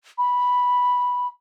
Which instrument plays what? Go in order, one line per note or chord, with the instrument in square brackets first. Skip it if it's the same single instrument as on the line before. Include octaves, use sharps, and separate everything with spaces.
[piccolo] B5